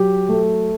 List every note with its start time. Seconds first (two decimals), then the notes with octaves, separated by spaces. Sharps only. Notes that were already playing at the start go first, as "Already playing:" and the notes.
Already playing: F#3 G4
0.29 A3